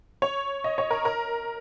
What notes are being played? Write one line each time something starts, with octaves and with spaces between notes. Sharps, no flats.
C#5
D#5
C#5
A#4
A#4